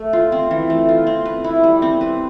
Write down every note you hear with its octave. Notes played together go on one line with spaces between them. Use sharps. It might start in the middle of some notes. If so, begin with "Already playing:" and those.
Already playing: A3
F4
C4
E3
A3
F4
C4
B4
E4
G3
C4
B4